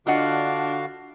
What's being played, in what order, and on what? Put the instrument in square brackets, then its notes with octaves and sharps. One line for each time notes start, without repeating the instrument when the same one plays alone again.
[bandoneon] D3 F#4 F5 [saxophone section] D4 [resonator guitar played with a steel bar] F4 D#5 F#5